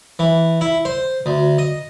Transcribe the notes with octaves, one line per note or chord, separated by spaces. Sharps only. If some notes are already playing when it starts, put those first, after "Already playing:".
E3
E4
C5
D2
D#5